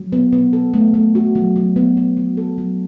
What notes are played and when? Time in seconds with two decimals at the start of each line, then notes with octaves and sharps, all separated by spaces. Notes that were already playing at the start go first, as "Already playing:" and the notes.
Already playing: F#3
0.12 B3
0.33 B3
0.53 A4
0.74 A3
0.94 A3
1.15 F#4
1.35 F#3
1.56 F#3
1.76 B3
1.97 B3
2.17 F#3
2.37 A4
2.58 F#3